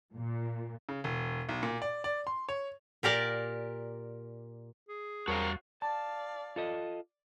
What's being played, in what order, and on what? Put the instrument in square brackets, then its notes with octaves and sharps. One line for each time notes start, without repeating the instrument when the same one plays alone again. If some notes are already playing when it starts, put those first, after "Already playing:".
[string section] A#2
[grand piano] C#3
E1
B1
A#2
D5
D5
C6
C#5
[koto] A#2 G4 A#4 D5
[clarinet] G#4
[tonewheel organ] E2 G3 A5 [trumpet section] C4 A#4 [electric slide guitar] F#4 C#5 F5
[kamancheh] D5 F5 [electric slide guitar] A5
[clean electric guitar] F4 A4 D#5